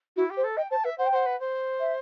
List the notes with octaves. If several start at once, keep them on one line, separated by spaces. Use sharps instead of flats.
E4 F#4
G4
C5
A4
D#5 G5
C5 A5
B4 E5
C5 F#5
G5
C5 F#5
B4
C5
E5